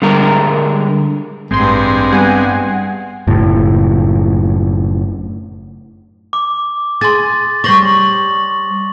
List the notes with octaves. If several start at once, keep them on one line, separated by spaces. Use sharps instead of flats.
D3 G3 G#3 A#4
A1 G2 G#3 C4 C6
G3 B3 F#5 G#5
F#1 A2
D6
G#4 C6 A6
G3 C5 C#5 C#6 A#6 F#7